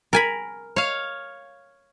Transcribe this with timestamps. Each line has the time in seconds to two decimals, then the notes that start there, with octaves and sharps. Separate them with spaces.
0.13 A#4 G#5 B5
0.76 C#5 F5